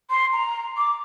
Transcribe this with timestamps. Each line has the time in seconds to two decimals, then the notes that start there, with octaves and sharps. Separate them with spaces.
0.09 C6
0.32 A#5
0.77 D6